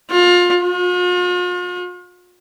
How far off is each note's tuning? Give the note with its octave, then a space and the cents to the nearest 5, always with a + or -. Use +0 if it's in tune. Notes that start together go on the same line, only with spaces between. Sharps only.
F4 +25
F4 +45